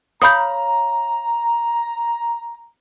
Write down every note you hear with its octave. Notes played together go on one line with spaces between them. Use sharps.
C#5 F5 A#5 B5 D#6 G6